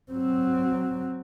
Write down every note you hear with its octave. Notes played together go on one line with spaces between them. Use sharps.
F#3 C4